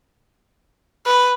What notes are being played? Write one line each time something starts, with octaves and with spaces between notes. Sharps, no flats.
B4